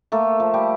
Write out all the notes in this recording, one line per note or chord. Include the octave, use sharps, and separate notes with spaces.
A3 A#3 A4
F3
G3 G4